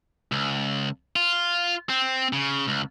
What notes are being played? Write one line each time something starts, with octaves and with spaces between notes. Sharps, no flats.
C#2
F4
C4
C#3
C#2